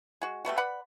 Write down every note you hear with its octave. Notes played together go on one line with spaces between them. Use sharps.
G#3 F#4
G3 A3 B3 F#4
B4 D5 F#5 B5